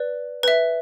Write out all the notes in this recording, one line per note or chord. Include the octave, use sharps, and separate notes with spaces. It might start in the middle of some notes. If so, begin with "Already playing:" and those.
Already playing: B4 D5
B4 E5